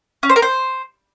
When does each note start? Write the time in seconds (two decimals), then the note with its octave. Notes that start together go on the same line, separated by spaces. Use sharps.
0.23 C#4
0.29 C5
0.36 A#4
0.42 C5